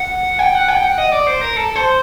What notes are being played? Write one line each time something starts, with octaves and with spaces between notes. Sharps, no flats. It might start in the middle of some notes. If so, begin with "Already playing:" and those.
Already playing: F#5
G5
F#5
G5
F#5
D#5
D5
C5
A#4
A4
C5